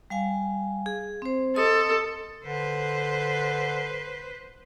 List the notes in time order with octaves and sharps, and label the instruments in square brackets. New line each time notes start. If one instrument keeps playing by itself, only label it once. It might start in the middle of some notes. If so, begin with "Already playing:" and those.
[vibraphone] G3 F5 G#5
G#4
C4 C5
[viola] A4 [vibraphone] D#5 C6 D#6
[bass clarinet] D3 [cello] B4 C5